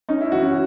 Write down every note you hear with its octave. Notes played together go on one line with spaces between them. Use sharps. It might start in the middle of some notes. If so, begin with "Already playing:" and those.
C#4 D#4
E4
E3 F#4
C#4